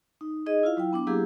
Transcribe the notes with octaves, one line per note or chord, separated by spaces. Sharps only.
D#4
D#4 G#4 D#5
E4 F4 F5
F#3 E4 G5
B3 D4 D6
F#3 A#3 E4 G4 G#4 F5